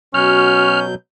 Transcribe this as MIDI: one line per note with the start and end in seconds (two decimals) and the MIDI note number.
0.14 0.94 47
0.14 0.94 54
0.14 0.83 61
0.14 0.85 66
0.14 0.80 89
0.14 0.94 91